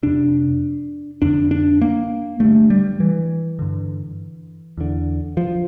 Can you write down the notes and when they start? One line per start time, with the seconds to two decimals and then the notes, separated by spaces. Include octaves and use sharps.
0.03 F2 C3 D4
1.22 F2 D3 D4
1.51 D4
1.81 A#3
2.40 G2 D3 A3
2.70 G3
3.00 E3
3.59 G2 D3
4.77 E2 D3
5.37 F3